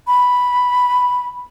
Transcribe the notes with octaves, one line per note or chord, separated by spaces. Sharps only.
B5